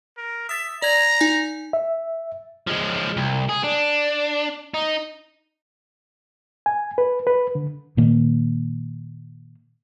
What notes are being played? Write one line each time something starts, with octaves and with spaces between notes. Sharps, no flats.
A#4
E5 D#6 A6 B6
D5 A#5 G#6
D#4 G#5
E5
F3 G#3
C2
G#4
D4
D#4
G#5
B4
B4
D3
A#2 D#3 A#3